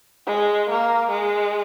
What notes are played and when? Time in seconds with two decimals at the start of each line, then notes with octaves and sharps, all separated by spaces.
0.27 G#3
0.69 A#3
1.11 G#3